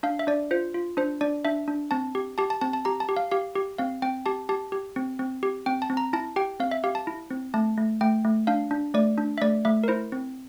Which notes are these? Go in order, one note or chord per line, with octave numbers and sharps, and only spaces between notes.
D4 F5
E5
D4 D5
F4 C5
F4
D4 C5
D4 D5
D4 E5
D4
C4 A5
G4
G4 A5
A5
C4 A5
A5
G4 A#5
A5
G4
F5
G4 F5
G4
C4 F5
C4 G5
G4 A5
G4 A5
G4
C4
C4
G4
C4 G5
A5
C4
A#5
E4 A5
G4 G5
C4 F5
E5
G4 F5
A5
E4
C4
A3 A5
A3
A3 G5
A3
D4 F5
D4
A3 D5
D4
E5
A3 D5
A3 E5
A#4
E4 C5
C4